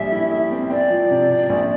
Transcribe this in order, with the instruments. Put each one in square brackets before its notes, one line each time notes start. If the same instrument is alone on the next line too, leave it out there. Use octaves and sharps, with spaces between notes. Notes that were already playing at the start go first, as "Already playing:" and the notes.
Already playing: [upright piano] A#1 G3 [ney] E5
[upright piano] E4
E4
C4
[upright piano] C4 [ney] D5
[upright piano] F3
C3
C3
A#1